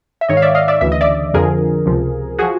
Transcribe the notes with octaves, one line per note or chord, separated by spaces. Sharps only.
E5
G#2 D#3 C#5 D#5
F5
D5 E5
D#5 F5
D5 E5
D2 C#3 E3 E5
D#5
D5 E5
F2 D3 F3 G#4 A#4
C#2 C3 F3
F3 F#4 G#4